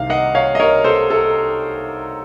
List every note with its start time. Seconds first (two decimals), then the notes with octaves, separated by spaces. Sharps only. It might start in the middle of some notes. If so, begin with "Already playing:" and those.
Already playing: C2 C3 D#3 F5
0.10 D#5 F#5
0.35 C#5 F5
0.55 D#5
0.60 A#4 C#5
0.84 A4 C5
1.10 A4